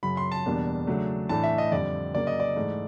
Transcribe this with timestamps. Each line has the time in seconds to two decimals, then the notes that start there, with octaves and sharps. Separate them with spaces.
0.03 F#2 C#3 F#3 B5
0.17 C6
0.32 A5
0.46 E2 B2 G3 A#3 D4
0.87 C#3 F#3 A3 D4
1.29 A2 E3 A3 D4 A5
1.43 E5
1.58 D#5
1.72 F2 D3 G3 D5
2.14 C#3 F#3 A#3 C#4 D5
2.27 D#5
2.40 D5
2.56 G#2 E3 A3